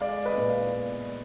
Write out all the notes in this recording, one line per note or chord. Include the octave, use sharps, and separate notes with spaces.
G#3 D5 F5
B4 D#5
A#2
D5 F5
B3